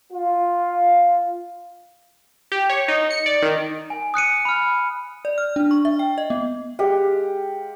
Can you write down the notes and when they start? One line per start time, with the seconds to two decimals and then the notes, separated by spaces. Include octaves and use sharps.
0.12 F4
2.52 G4
2.70 C#5
2.88 D#4
3.11 C#7
3.26 D5
3.42 D#3
3.90 G#5
4.14 D#6 F#6 C#7 D#7
4.45 B5 F6
5.25 D5
5.38 F6
5.56 D4
5.71 C#6
5.85 E5
5.99 G5
6.18 D#5
6.30 B3
6.79 G#3 G4 F5 F#5